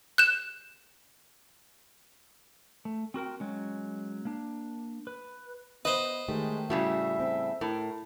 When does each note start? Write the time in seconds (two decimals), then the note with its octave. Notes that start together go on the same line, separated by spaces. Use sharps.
0.18 F#6 G6 E7
2.85 A3
3.14 C4 F#4 A#4 G5
3.40 F#3 G#3 C#4
4.25 A#3 D4
5.07 B4
5.85 B3 B4 C5 D#5
6.28 D#3 G#3 A3 G4
6.70 A2 C#3 G3 F#4 E5
7.20 C4
7.61 A2 A#4